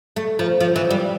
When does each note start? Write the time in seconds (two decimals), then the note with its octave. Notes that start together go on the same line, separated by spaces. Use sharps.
0.16 A3
0.39 F3
0.61 F3
0.76 E3
0.91 G3